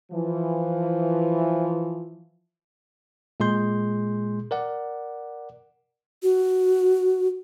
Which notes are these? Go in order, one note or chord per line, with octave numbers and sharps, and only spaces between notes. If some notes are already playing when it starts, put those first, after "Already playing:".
E3 F3
A#2 G#3 G#4 C6 G6
A#4 D5 F#5
F#4